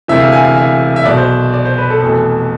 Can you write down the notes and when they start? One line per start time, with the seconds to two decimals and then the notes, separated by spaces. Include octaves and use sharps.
0.08 E1 D2 C3 E3 E5
0.20 F5
0.32 G#5
0.44 F5
0.56 E5
0.96 E5
1.05 B1 B2 D5
1.17 C5
1.54 D5
1.65 C5
1.78 B4
1.90 A4
2.02 F1 E2 B2